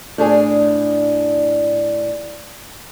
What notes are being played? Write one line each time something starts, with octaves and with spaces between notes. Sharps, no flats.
A2 D4 G#4